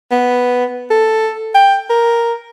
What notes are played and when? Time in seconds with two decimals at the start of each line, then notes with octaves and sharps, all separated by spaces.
0.11 B3
0.91 A4
1.55 G5
1.90 A#4